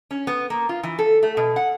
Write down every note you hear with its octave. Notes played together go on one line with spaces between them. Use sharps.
C#4
B3
A#3
F4
E3
A4
A3
B2
F#5